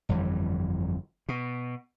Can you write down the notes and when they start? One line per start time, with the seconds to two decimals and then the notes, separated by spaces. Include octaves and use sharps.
0.09 G1 F2 E3 G3
1.29 B2